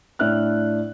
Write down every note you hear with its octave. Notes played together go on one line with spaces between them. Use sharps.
A2 D4 E5 F6 F#6